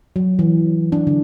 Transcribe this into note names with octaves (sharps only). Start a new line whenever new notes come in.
F#3
E3
D4
D3